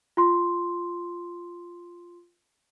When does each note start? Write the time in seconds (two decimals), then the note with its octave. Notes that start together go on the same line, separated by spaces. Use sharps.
0.17 F4 C6